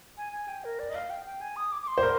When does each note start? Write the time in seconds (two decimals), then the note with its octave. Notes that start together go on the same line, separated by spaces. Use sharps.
0.17 G#5
0.33 G#5
0.48 G5
0.64 A#4
0.79 D5
0.90 D#5
0.95 F5
1.10 G5
1.25 G5
1.41 G#5
1.56 D#6
1.72 D6
1.82 D6
1.88 C6
1.98 C5
2.03 A#4